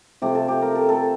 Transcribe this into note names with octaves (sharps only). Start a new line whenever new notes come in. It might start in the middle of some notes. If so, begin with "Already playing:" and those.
C3 F3 A3 G4
A4
G4
A#4
A4
A4